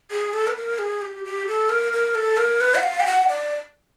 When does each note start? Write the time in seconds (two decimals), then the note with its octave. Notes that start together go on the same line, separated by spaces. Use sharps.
0.11 G#4
0.33 A4
0.47 B4
0.56 A#4
0.78 G#4
1.02 G4
1.25 G4
1.47 A4
1.69 A#4
1.93 A#4
2.15 A4
2.37 A#4
2.61 B4
2.75 F#5
2.83 F5
3.00 G5
3.06 F#5
3.28 D5